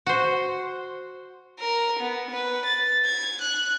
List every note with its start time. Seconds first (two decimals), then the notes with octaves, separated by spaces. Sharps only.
0.06 F#4 C5
1.59 A#4
2.00 B3
2.31 B4
2.66 A6
3.05 G#6
3.42 F#6